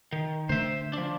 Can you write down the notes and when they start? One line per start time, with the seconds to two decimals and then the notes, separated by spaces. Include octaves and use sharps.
0.12 D#3
0.49 D3 A3 C5 E5
0.93 F3 D4